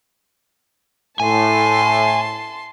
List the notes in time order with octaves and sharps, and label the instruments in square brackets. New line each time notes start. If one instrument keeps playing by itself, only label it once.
[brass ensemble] A2 [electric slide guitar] G#5 [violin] A5 C6